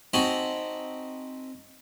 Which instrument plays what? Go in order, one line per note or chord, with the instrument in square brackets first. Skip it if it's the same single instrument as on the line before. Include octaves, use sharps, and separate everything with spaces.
[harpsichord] C4 D#4 F#4 G#5 A5 B5